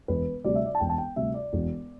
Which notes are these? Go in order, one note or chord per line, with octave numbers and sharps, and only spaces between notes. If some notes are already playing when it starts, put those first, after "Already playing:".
E1 B4
D2 C3 G3 D5
E5
D5
A5
E1 G5
A5
G5
D2 C3 G3 E5
D5
E1